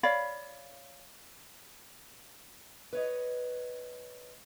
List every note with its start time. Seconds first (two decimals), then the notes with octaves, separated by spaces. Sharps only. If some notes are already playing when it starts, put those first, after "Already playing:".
0.03 C#5 D5 F5 B5
2.93 B4 C#5 D#5